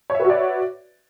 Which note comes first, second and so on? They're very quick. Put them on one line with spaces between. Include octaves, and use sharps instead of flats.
C#5 E5 B4 F#4 D5